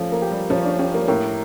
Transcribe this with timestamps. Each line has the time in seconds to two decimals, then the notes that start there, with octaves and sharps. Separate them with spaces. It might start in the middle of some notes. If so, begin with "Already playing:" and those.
Already playing: F3 A3 C#4
0.12 A#3
0.22 G4
0.31 G3
0.50 F3 C#4
0.65 D4
0.79 C#4 G4
0.94 A#3
1.08 A2 A#3